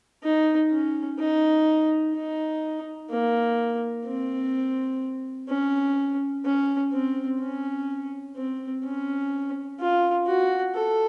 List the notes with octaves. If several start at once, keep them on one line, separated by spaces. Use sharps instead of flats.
D#4
C#4
D#4
D#4
A#3
C4
C#4
C#4
C4
C#4
C4
C#4
F4
F#4
A4